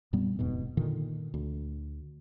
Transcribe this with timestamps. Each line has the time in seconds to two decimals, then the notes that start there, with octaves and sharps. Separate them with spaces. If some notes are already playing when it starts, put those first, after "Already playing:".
0.13 F2 A#2 G3 B3
0.39 D#1 F2 G#2 B2
0.77 A#2 D3 D#3
1.34 D2